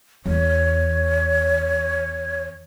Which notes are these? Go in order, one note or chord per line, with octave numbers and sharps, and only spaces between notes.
E2 C#5